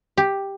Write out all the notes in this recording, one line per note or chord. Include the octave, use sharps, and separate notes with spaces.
G4